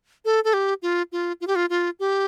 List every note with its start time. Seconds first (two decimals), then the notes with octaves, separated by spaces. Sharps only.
0.25 A4
0.44 A4
0.53 G4
0.82 F4
1.12 F4
1.41 F4
1.47 G4
1.56 F4
1.70 F4
2.00 G4